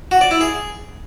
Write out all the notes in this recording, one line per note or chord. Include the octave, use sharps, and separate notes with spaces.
F#4
D5
E4
G#4